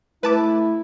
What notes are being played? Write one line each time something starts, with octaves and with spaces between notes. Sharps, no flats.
A3 E4 B4 A5 D6